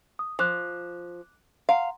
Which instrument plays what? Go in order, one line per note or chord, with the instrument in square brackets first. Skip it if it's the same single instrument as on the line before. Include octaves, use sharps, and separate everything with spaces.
[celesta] D#6
[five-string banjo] F3 [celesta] D6 F#6
[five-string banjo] F5 [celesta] F#5 A#5 C6